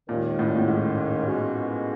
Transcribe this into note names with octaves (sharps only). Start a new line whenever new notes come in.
D#2 A#2 D#3 G#3 C#4
A2
A#2
A2
G#2
B2 G#3 C#4 F#4